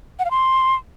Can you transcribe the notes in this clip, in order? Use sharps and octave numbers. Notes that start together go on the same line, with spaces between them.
F#5
F5
C6